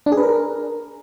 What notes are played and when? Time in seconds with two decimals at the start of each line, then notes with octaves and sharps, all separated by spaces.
0.06 D4
0.12 G#4
0.17 B4
0.23 A#4